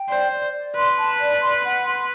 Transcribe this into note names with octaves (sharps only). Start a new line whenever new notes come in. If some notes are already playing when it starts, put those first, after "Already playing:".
Already playing: G5
C5 D5
D5
D5
B4 C6
A5
D5
C6
F#5
C6